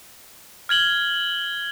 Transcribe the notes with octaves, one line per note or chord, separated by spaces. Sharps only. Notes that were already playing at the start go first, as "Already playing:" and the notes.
F6 G#6 F#7 G7